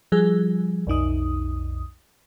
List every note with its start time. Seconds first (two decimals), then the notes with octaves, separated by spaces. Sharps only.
0.12 F3 G3 G#4
0.87 B1 F2 D#4 D#6